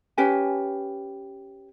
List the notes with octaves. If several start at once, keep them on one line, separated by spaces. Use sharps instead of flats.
C#4 G4 B4 G#5